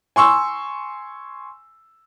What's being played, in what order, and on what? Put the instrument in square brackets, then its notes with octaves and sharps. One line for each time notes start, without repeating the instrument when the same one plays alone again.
[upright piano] G#5 C6 C#6 E6